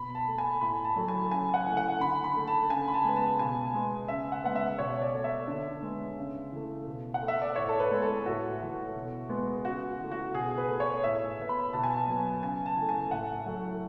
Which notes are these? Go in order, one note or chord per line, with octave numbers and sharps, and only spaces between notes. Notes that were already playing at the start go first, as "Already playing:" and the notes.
Already playing: B2 B5
A5
A3
G#5
A2 B5
A5
F#3 A3
G#5
C#3 G#5
F#5
E3 A3
F#5
D3 B5
B5
A3
A5
C#3 G#5
B5
A5
G#3 B3
A5
B2 G#5
G#3 B3
C#3 E5
F#5
G#3 B3 F#5
E5
B2 C#5
D5
A3
E5
D3
G#3 B3
C#3
E3 A3
B2
F#5
A3
E5
D5
A2 C#5
A4
B4
G#3 B3
A4
A2 F#4
E3 A3
B2
G#3 B3
C#3 F#4
E3 A3
F#4
B2 G#4
B4
A3
C#5
A2 E5
E3 B3
B5
B2 A5
G#5
A5
F#3 B3
C#3 G#5
A5
E3 A3
G#5
A2 F#5
F#3 A3